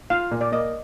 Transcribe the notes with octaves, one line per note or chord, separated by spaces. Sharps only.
F4 F5
A#2
D5
A#3 D#5